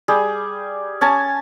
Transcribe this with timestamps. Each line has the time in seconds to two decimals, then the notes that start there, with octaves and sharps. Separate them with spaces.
0.08 G3 G#4
1.01 C#4 G#5 A5